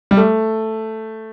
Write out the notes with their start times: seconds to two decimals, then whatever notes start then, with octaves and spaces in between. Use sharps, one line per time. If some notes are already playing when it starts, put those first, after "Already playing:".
0.11 G3
0.17 A3